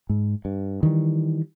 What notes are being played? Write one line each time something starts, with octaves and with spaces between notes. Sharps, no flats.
G#2
G2
D#3 E3 G3